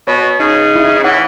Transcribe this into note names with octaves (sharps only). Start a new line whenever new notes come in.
B2 C#5
C#3 D#4
E4
E3 C#5 F#5 B5